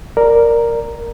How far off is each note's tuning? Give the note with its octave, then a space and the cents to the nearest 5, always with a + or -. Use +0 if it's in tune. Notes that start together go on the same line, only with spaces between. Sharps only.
A#4 +0 D5 +0